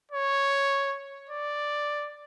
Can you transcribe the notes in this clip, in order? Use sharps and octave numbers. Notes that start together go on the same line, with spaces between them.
C#5
D5